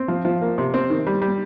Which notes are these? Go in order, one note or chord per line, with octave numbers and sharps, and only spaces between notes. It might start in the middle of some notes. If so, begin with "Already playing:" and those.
Already playing: C4
F3
F3
A#3
C3
C4
D#3
G3
G3